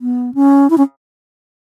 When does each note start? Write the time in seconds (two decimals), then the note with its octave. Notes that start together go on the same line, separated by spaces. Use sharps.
0.01 B3
0.34 C#4
0.70 E4
0.78 C#4